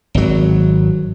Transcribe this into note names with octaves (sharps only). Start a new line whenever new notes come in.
G#1 F#3